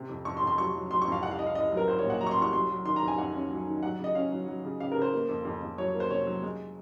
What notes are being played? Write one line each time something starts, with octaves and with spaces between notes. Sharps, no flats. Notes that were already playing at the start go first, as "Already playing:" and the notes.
Already playing: C3
F2
F2 C#6
C6
F2
C6
F#3 C#6
F#3
F#3 C6
C#6
F2 F5
C2 F#5
F5
C2 D#5
F5
C2 D#5
F#3 A#4
C2 C5
C#5
A#2
F#5
F#3 A#5
C#6
C6
C2
C#6
F#3 C6
F#3
D#3 C6
A#5
F2
G#5
F2 F#5
C#4
F#3
D#3
F#3 F#5
C#3 D#5
C#4 F5
F#3
F#3
C#3
C#3 F5
A#4
C#3
C5
A#3
F2
F2
F2
F#3 C#5
A#3
C5
C3 C#5
F#3
G#3